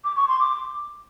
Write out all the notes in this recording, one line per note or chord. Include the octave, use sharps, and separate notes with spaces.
D6
C#6
C6
D6